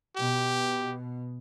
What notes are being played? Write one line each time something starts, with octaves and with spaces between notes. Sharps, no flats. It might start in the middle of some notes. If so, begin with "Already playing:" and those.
B2 G4